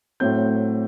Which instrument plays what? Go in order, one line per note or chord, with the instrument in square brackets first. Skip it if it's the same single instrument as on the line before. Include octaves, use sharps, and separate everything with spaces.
[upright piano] A2 F#3 C4 G6